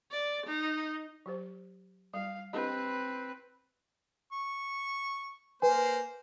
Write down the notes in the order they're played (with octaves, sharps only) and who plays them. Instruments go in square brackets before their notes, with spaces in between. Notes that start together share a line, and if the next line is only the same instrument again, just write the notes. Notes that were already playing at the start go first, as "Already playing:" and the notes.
[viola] D5
D#4
[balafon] F#3 G4 C5
[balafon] G3 [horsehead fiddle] F5
[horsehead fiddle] C4 B4 [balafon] D4 G4 D#5
[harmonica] C#6
[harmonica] A#3 C5 [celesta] B4 G#5